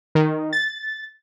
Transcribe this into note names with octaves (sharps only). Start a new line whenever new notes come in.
D#3
A6